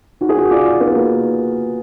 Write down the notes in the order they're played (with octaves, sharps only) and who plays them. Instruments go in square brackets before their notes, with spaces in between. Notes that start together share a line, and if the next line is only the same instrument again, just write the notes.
[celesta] D#4 [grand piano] F#4
[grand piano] G#4
F#4
[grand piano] F4 [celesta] F#4 D5 G#5 D6
[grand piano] B3 [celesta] D#4
[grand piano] A#3